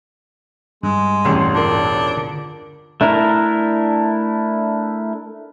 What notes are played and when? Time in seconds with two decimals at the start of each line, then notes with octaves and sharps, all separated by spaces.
0.83 G2 G#3
1.25 E1 A1 C6 C#6
1.55 D4 F4 A#4
2.17 D3
3.01 A3 D4 E4 A#4